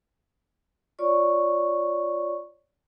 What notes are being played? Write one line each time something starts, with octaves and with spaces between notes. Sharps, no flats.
F4 C#5 D5 C#6